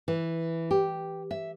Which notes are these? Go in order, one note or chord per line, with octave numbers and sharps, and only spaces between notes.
E3
G4
E5